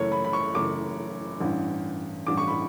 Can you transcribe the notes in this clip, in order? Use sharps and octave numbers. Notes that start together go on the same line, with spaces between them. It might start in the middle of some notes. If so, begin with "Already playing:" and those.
Already playing: F#1 F#2 E3 A3 C#5
B5
B5
C#6
F#1 F#2 E3 A3 D6
A1 G2 E3
A1 G2 E3 D6
C#6
B5